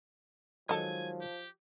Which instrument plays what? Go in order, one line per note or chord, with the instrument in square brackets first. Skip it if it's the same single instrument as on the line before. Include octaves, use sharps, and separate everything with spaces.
[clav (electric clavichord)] D#3 F#3 G#3 [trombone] F3 [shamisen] A4 D#5 [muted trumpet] G#5
[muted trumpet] G4